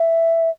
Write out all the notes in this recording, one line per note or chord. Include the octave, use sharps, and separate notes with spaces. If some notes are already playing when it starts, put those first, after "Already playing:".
Already playing: E5